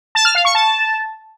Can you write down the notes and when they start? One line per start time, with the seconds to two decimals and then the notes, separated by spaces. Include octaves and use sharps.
0.15 A5
0.25 F6
0.35 F5
0.45 C#6
0.55 A5